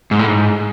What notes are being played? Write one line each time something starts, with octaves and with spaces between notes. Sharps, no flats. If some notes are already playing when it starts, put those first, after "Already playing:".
G#2
A2
G#2